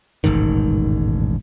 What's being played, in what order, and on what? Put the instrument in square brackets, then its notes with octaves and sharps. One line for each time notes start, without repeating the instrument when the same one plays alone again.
[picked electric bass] E1 A1 G#2 D#3